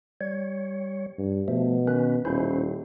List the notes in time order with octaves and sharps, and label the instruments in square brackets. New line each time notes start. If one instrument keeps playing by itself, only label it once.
[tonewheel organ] G3 C#5
[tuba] G2
[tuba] B2 [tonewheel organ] F3 A3
[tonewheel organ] D#3 C#4 B4
[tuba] D#1 [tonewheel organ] C#4 E4 C5